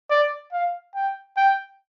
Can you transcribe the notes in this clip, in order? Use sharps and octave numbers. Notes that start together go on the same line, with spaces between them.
D5
F5
G5
G5